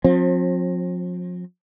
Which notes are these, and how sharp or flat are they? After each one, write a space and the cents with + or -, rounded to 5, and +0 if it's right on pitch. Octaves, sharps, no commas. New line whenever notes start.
F3 +40 C4 +25